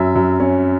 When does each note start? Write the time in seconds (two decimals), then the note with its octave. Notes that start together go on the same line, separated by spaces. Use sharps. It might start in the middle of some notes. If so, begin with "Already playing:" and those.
Already playing: F#2 F#3 E5
0.16 F#2
0.40 C#4